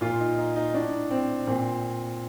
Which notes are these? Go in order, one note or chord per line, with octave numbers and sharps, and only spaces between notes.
A#2 F4
D#4
D#4
D#4
A2 D4
C4
A#2 C4